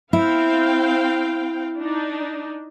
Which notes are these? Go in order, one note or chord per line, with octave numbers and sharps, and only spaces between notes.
C4 E4 F5 G5
D4 D#4